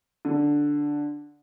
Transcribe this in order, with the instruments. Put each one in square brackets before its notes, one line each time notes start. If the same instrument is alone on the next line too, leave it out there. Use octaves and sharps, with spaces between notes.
[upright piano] D3